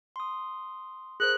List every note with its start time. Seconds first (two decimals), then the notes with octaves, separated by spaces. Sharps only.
0.16 C6 D#6
1.20 G#4 A#4 C5 F#6